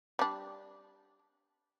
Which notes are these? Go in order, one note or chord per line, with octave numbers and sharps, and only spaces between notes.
G3 D4